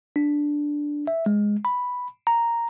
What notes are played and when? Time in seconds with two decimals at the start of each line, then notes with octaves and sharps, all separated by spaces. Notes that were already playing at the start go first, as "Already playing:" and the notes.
0.16 D4
1.07 E5
1.26 G#3
1.65 B5
2.27 A#5